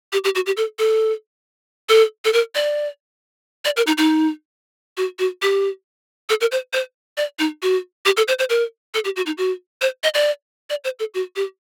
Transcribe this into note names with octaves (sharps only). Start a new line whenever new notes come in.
G4
G4
F#4
G4
A4
A4
A4
A4
A#4
D5
D5
A#4
D#4
D#4
F#4
F#4
G4
A4
A#4
C5
C5
D5
D#4
F#4
G4
A4
C5
C5
A#4
A4
G4
F#4
D#4
F#4
C5
D#5
D5
D5
C5
A4
F#4
G4